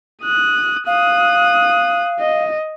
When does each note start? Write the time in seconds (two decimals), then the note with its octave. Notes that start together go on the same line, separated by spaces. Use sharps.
0.23 D#6 F#6
0.87 F5 D#6 F#6
2.20 D#5